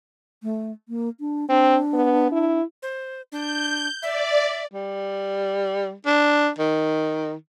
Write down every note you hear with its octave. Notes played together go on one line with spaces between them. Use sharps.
A3
A#3
D4
C4 D4
B3
E4
C5
D4 G6
D5 E5
G3
D4
D#3